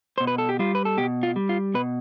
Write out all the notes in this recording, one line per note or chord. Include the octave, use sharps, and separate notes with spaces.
B2 C5
B4
A4
G4
G3 F4
B4
A4
B2 G4
F4
G3
F4
B2 B4